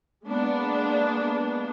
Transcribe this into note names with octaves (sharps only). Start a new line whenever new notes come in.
G#3 A#3 B3 D4